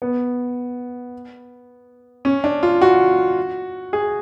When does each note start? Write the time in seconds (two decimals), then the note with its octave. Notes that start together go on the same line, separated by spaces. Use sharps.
0.02 B3
2.25 C#4
2.44 D4
2.63 F4
2.82 F#4
3.93 G#4